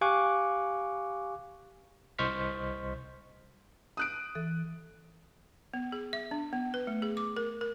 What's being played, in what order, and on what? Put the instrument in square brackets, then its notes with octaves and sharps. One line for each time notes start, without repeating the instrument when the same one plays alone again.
[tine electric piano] G4 F5 G#5 C#6 D6 F#6
C2 C5 D#5 C#6 F6 B6
[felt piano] D#6 F#6 D7
[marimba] E3 A4 E5
[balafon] B3
G#4
E5
D4
B3
B4
A3
G#4
D6
A#4
A#4